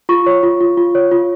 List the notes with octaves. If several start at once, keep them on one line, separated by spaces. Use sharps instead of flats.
F4 C#6
C#5
F4
F4
F4
C#5
F4